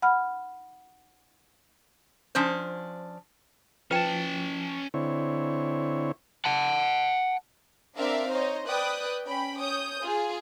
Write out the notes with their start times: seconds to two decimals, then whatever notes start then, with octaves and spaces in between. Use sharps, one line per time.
0.02 F#5 B5 F6
2.35 F3 C#4 D4 C5
3.91 F3 C#4 B4 G5 A5
4.94 D3 C4 E4 C#5
6.45 F#5 A5
7.97 C4 D4 A#4 D5 E5 F5
8.29 D#4 C5 C#5 D#5
8.69 B4 D5 G5 D#6 F#6
9.26 C#4 G5 B5
9.59 C#5 D#6 G6
10.03 F4 G#4